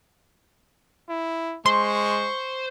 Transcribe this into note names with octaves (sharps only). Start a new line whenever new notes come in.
E4
G#3 C5 C6 C#6